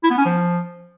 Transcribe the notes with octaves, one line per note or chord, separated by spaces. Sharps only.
E4
B3
C#4
F3